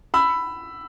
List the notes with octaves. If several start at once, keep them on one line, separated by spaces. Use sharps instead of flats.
B5 E6